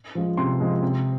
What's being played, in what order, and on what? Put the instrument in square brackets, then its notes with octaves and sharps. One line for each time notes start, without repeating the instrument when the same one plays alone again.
[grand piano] F3 G#3
C3 C6
F3 G#3
C3